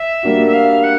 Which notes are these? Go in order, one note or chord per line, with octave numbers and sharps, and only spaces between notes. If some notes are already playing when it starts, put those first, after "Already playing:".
Already playing: E5
G3 A#3 D4 F#4
E5
F5
F#5